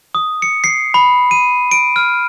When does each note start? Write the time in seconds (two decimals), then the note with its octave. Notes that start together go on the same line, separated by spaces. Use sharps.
0.15 D#6
0.42 C#7
0.64 C7
0.94 B5
1.31 D#7
1.71 D7
1.96 F6